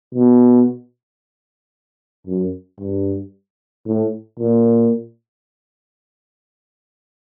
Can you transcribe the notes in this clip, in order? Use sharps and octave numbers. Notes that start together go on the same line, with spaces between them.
B2
F#2
G2
A2
A#2